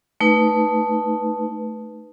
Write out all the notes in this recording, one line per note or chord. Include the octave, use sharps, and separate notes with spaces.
A3 D#4 B4